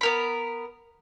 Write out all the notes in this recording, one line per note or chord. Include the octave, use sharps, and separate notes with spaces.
B3 A#4 B5